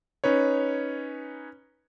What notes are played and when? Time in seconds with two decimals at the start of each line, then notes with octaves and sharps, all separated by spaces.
0.24 C#4 D#4 B4 C#5